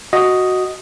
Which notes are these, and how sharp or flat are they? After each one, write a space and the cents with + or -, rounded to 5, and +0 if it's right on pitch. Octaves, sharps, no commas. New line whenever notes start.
F#4 +0 D#5 +0